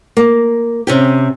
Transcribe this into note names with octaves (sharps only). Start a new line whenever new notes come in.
A#3
C3 C#4 G4